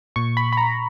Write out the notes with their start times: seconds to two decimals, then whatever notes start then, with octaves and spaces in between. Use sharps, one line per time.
0.16 A#2 C#6
0.37 B5
0.52 B5
0.57 A#5